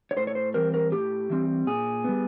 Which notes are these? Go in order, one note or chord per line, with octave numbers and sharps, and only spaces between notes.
C#5
A2 C5
C#5
C5
E3 G3 C4 A#4
A#4
A2 G4
E3 G3 C4
A#2 G#4
G3 B3